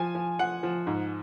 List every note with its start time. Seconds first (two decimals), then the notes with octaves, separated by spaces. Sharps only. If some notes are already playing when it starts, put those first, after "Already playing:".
Already playing: F3 G#5
0.15 F3
0.39 F3 F#5
0.63 F3
0.87 G#2